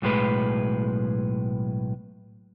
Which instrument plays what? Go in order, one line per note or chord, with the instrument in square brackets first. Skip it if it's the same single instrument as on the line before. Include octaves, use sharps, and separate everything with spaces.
[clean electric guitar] B1 A2 G#3 B4